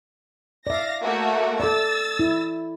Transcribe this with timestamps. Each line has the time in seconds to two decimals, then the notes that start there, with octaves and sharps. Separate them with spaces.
0.67 D5 E5 F5 A#6
1.02 A3 A#3 F#4
1.60 A4 D5 E6 A6
2.19 E4